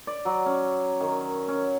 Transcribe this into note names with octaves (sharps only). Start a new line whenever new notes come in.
D5
F#3
C#4
D#3
C#4